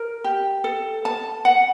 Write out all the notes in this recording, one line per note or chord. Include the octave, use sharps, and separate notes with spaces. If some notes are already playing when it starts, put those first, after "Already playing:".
Already playing: A#4
G4
A4
A5
F#5